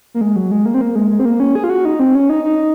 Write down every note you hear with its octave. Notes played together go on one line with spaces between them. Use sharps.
A#3
G#3
F#3
G#3
A#3
C4
A#3
G#3
G#3
C4
A#3
C#4
G#4
F4
F#4
D#4
C4
C#4
D#4
D#4